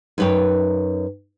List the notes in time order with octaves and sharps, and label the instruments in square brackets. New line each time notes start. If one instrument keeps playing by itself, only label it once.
[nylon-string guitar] F#2 D#4 B4 C#5 G5